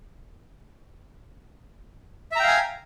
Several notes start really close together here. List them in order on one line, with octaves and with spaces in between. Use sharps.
E5 A#5 G5 F5 G#5